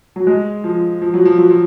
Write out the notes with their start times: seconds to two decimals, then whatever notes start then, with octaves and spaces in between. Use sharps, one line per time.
0.16 F#3
0.27 G#3
0.64 F3
1.01 F3
1.14 F#3
1.25 F3
1.38 F#3
1.50 F3